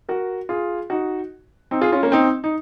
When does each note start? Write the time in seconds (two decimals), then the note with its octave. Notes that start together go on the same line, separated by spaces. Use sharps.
0.09 F#4 A#4
0.49 F4 G#4
0.90 D#4 F#4
1.71 C4 D#4
1.81 F4 G#4
1.92 C#4 F4
2.03 A#3 C#4
2.12 C4 D#4
2.44 D#4